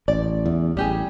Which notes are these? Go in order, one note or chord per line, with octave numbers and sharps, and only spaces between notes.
A1 D5
E2
A1 G3 G4 G#4